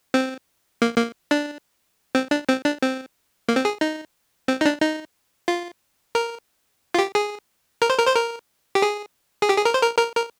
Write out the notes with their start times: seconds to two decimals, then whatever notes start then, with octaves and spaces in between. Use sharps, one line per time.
0.14 C4
0.82 A#3
0.97 A#3
1.31 D4
2.15 C4
2.31 D4
2.49 C4
2.65 D4
2.82 C4
3.48 A#3
3.56 C4
3.65 G#4
3.81 D#4
4.48 C4
4.61 D#4
4.65 D4
4.81 D#4
5.48 F4
6.15 A#4
6.94 F4
6.99 G4
7.15 G#4
7.82 A#4
7.90 C5
7.99 A#4
8.07 C5
8.15 A#4
8.75 G4
8.82 G#4
9.42 G#4
9.49 G4
9.57 G#4
9.65 A#4
9.74 C5
9.82 A#4
9.98 A#4
10.16 A#4